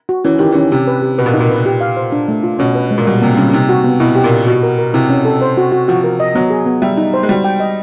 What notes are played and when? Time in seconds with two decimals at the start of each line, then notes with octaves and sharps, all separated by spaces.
0.09 F#4
0.24 E3 C#4
0.38 D#3 G4
0.52 E3 C#4
0.72 C3 G4
0.87 B4
1.02 G4
1.18 B2 B4
1.26 A#2
1.34 D#4
1.40 A#2
1.50 B4
1.66 G4
1.81 F5
1.97 C5
2.12 D4
2.28 A3
2.43 F4
2.59 B2 C#4
2.75 B4
2.91 G#3
2.98 A#2
3.07 B2 G3
3.22 C3 A#3
3.37 C#3 G3
3.53 C3 D#4
3.69 F#4
3.84 B3
4.00 B2 E4
4.15 G4
4.24 A#2
4.32 G4
4.47 B2 F#4
4.63 A#4
4.79 A#4
4.94 C3 E4
5.09 C#4
5.25 A4
5.41 C5
5.57 F#4
5.72 F#4
5.88 F3 F#4
6.04 A#4
6.20 D#5
6.35 F#3 B3
6.50 G#4
6.66 B3
6.82 G3 E5
6.97 D#4
7.14 C5
7.23 G#3
7.29 G3 F#4
7.44 G5
7.60 D#5